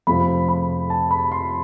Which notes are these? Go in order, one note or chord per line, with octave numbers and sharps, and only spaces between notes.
F2 C3 F3 A3 C4 B5
B5
A5
B5
C6